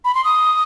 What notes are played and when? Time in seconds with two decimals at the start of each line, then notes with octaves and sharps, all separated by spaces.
0.05 B5
0.14 C6
0.24 D#6